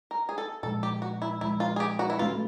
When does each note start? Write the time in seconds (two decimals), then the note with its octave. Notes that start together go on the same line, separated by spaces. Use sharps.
0.11 A#4
0.29 G#4
0.38 A4
0.63 A#2 F3 G#3 A4
0.83 G4
1.02 F#4
1.22 E4
1.41 A#2 F3 G#3 E4
1.60 F4
1.76 G#4
1.80 G4
1.99 F#4
2.10 E4
2.18 A3 C#4 F4 F#4 B4